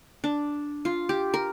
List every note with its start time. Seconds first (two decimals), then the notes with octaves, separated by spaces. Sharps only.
0.24 D4
0.85 F4
1.09 G4
1.34 A#4